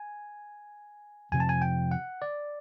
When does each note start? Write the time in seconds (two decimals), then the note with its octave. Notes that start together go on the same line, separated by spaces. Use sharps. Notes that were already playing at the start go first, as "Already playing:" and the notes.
Already playing: G#5
1.32 F2 C3 F3 G#5
1.40 A5
1.49 G#5
1.62 G5
1.91 F#5
2.22 D5